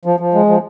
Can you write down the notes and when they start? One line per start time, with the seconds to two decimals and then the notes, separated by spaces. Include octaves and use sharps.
0.05 F3
0.20 F3
0.34 G#3
0.48 F3